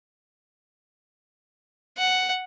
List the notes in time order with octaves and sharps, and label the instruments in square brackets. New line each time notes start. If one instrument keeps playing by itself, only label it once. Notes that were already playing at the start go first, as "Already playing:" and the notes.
[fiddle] F#5